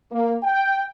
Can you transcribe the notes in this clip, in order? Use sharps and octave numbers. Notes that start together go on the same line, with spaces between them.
A#3
G5